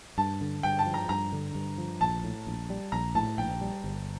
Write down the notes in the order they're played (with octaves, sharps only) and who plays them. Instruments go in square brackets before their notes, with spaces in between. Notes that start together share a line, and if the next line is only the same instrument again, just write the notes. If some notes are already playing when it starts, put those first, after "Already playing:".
[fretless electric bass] G2 [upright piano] A5
[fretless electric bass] D3
[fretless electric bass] G2 [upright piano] G5
[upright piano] A5
[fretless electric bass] F3
[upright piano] A#5
[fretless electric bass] G2 [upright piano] A#5
[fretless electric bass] D3
G2
F3
[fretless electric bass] A#1 [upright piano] A5
[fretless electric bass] A2
A#1
G3
[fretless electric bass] A#1 [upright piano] A#5
[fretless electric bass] A2 [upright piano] A5
[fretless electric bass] A#1 [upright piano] G5
[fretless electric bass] G3
G1